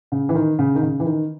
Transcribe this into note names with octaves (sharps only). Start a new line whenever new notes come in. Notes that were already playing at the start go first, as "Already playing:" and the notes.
C#3
E3
D#3
C#3
D#3
C#3
E3
D#3